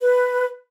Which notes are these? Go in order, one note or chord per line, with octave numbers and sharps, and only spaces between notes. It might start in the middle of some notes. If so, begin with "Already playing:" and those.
B4